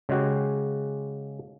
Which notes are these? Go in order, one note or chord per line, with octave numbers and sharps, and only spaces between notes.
C#3 G#3 F#4 G4